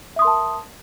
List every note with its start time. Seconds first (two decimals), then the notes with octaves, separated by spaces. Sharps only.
0.16 E5
0.19 D#6
0.22 C6
0.25 A#4
0.27 A5